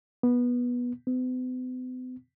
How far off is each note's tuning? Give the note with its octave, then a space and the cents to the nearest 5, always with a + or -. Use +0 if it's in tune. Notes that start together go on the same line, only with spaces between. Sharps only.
B3 -15
B3 +45